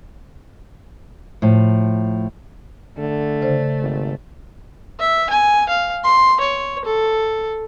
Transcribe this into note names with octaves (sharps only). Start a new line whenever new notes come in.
A2 F3
D3 A3
C#3 C5 D5
G#1
E5
G#5
F5
C6
C#5
A4